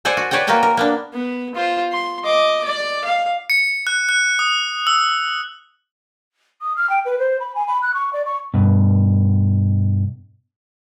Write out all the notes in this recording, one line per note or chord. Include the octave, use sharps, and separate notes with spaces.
A4 C5 D5 F#5 G#5
F#4
B4 C#5 D5 F#5 G5
A#3 F#4 A#4 B4 G5 A5
A#4
A#3 B3 D4
B3
F4 C5
C6
D#5 D6
D5
F5
C#7
F#6
F#6
D#6
E6
D#6
F6
G5
B4
C5
B5
G#5
B5
F#6
C#6
D5
C#6
G2 B2